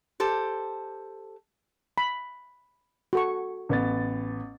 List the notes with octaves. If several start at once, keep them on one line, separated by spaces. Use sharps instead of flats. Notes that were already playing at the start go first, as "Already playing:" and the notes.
G4 A4 C5
B5
F#4 A4 C#6
A1 B3 A6